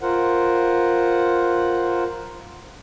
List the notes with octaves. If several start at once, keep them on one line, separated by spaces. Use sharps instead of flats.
F4 A#4 C5 F#5